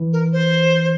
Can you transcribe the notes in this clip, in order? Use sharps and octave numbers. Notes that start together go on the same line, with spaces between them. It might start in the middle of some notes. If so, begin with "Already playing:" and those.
Already playing: E3
A#4
C5